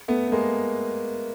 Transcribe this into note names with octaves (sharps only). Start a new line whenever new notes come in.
A3 B3
B3
G#3 A#3